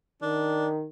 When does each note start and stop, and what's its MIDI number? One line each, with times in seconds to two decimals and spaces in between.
0.22 0.87 51
0.22 0.67 62